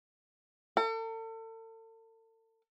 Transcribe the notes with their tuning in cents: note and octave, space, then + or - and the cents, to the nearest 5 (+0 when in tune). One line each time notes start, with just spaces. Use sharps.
A4 +40